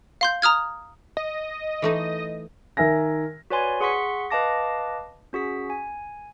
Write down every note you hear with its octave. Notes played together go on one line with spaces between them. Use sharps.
F5 C6 G6
A#5 D#6 F6 G#6
D#5
E3 A3 D#4
D#3 A#4 E5 G#5 A#6
F#4 B4 C#5 D5 G#5 C6
G#4 F#5 C6 C#6 B6 C#7
B4 D#5 F5 A5 D6 A#6
C#4 F#4 G#4 B6
G#5